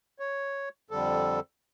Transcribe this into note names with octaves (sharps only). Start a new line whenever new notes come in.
C#5
F2 D3 G3 A4